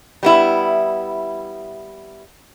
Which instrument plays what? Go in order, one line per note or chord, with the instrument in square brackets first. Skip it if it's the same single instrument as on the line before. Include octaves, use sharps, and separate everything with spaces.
[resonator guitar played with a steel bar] G3 B3 E4